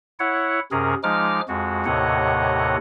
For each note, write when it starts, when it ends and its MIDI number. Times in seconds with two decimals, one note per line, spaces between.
0.20 0.60 64
0.20 0.60 73
0.20 0.60 78
0.71 0.95 42
0.71 0.95 48
0.71 0.95 61
0.71 0.95 68
0.71 0.95 70
1.03 1.41 53
1.03 1.41 56
1.03 1.41 63
1.03 1.41 86
1.03 1.41 89
1.48 1.85 41
1.48 1.85 56
1.48 1.85 66
1.85 2.76 39
1.85 2.76 45
1.85 2.76 48
1.85 2.76 73
1.85 2.76 75
1.85 2.76 78